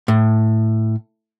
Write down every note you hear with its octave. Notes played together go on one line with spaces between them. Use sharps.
A2